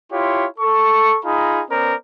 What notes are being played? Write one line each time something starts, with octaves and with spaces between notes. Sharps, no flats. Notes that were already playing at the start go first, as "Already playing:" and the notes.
E4 F4 G4 C#5 C6
A4 C#6
D#4 F4 G#4 A#5 B5
B3 C#4 A#4 C5 D5